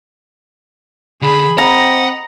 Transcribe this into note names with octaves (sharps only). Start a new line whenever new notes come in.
D3 G#4 B5
C4 D#5 F#5 A#5 B5